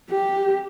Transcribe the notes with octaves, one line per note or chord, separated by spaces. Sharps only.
G4